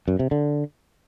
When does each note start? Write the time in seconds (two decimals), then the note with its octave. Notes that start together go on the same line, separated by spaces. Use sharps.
0.08 F#2
0.19 C3
0.31 D3